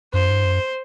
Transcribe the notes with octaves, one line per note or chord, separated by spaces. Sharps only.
F#2 C5
G2
F#2